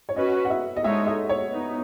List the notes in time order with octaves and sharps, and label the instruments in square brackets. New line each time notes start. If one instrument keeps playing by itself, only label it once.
[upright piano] C#5
[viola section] C#4 F#4 B4 [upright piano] D#5
[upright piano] F#5
E5
D#5
[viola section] G#3 D#4 A4 C#5 [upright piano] E5
[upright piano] E5
C#5
[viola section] B3 D#4